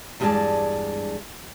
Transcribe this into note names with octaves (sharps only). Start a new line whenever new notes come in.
E2 G2 G#3 G#4 D5 A5